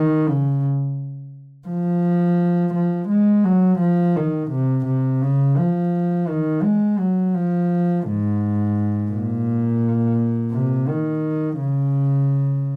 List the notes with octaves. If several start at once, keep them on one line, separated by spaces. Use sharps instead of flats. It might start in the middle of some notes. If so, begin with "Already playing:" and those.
Already playing: D#3
C#3
F3
F3
G#3
F#3
F3
D#3
C3
C3
C#3
F3
D#3
G#3
F#3
F3
G#2
A#2
C3
D#3
C#3